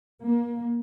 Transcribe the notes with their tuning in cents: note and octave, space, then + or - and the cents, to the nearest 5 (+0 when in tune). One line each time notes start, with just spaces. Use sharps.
A#3 +25